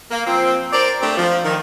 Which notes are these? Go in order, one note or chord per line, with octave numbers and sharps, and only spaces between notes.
A#3
F3 C4
A#4 C5 D5
A3 C4 D4 G4
F3
D#3